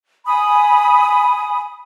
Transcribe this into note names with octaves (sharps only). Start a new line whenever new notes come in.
G#5 B5 D#6